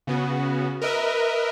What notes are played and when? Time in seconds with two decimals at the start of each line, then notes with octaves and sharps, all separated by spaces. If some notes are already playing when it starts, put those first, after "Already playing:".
0.07 C#3 B3 F#4
0.81 A#4 B4 D#5 E5